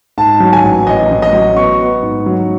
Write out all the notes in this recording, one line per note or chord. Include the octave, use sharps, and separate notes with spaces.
G#2 A5
F#3
G#5
A1
A1 D#5
A1
D#5
F#3
B3 C#6
B3
G#2
F#3